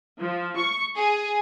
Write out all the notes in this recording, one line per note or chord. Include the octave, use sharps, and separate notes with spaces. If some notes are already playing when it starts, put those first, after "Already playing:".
F3
C#6
G#4